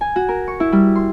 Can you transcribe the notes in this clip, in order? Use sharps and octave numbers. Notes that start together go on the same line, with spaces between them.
G#5
F#4
A#4
C#6
E4
G3
C6